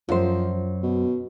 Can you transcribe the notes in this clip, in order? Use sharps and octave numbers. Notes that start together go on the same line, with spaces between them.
F#2 F3 C5
B2